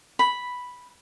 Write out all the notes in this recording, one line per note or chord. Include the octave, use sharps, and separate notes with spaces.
B5